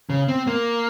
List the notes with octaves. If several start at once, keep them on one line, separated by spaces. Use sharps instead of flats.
C#3
C4
A#3